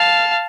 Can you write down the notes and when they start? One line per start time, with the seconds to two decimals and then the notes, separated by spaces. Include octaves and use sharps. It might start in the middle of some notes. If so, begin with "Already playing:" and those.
Already playing: F5 A5